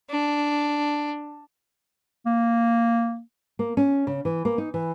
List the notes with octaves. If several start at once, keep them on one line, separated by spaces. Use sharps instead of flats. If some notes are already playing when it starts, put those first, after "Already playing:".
D4
A#3
A#3
C#4
C#3
E3
A#3
D#4
E3